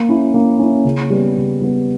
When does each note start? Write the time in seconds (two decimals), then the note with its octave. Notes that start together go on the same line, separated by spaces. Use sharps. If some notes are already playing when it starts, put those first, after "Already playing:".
Already playing: A#3
0.09 C#4 E4
0.34 A#3
0.59 C#4 E4
0.85 C#3
1.10 G3 B3
1.36 C#3
1.61 G3 B3